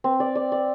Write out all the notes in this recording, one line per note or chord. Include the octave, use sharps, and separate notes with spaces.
C4
D5
D5
D5